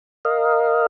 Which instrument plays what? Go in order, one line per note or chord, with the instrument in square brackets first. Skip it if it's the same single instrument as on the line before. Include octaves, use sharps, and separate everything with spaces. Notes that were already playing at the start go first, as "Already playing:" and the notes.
[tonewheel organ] A#4 D#5 F5